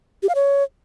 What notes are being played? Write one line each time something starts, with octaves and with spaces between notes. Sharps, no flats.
G4
F5
C#5